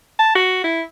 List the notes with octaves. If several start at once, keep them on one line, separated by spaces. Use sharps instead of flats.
A5
F#4
E4